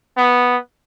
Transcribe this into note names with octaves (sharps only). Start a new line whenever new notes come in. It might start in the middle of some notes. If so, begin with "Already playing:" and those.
B3